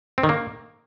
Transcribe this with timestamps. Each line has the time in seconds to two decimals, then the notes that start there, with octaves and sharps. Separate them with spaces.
0.18 C4
0.23 D#3
0.29 A#3